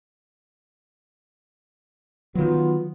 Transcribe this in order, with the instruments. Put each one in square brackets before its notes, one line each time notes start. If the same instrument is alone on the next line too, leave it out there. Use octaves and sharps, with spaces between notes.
[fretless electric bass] D#3 F#3 [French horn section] B3 F4